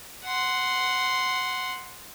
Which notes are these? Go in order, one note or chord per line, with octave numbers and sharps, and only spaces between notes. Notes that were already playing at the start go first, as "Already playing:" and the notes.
F#5 C6